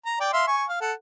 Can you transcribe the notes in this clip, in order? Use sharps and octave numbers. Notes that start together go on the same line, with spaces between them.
A#5
D5 G5
E5 F5 C6
G#5 C#6
F5
A4 F#5